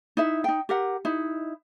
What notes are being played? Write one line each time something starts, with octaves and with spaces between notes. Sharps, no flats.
D#4 E4 E5
D#4 G5
G4 A#4 F#5
D#4 E4